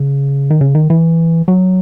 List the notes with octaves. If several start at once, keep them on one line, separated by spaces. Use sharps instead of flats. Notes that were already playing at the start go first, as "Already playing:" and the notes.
Already playing: C#3
D#3
C#3
D#3
E3
F#3